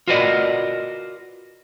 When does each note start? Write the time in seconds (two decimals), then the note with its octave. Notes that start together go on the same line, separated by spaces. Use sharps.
0.08 F4 F#4 A#4 B4 D5 D#5